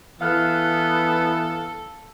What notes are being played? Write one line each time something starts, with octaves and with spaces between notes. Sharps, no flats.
E3 B3 A4 F5 F6 F#6